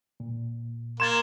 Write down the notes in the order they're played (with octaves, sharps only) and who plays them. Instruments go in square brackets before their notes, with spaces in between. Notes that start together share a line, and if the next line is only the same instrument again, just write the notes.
[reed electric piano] A#2
[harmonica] A#3 [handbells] C6 G#6 A6 [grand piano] E7